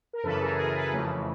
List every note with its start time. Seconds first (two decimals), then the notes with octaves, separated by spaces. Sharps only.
0.13 A#4
0.23 F#2 C#3 E3 A4 B4
0.41 G#4 A#4
0.58 G#4 A#4
0.75 A4 B4
0.93 F2 C#3 E3 A3